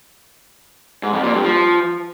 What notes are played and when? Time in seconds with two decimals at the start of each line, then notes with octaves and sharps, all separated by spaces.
1.03 G#2
1.13 F2
1.24 A#2
1.34 G2
1.44 F3